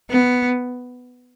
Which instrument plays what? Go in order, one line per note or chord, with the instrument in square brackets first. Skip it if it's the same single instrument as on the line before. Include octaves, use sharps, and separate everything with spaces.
[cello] B3